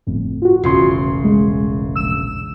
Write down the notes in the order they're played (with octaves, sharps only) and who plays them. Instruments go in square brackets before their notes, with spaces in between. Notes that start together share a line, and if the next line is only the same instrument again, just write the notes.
[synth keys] G1 F2 A2
F4 F#4
[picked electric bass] E1 A1 C#3 [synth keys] C6 C7
[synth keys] G#3
A#1 E6 E7